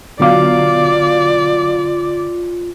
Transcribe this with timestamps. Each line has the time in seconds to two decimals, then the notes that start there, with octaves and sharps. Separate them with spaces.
0.20 B2 D3 F#3 F4 D5 F5 D6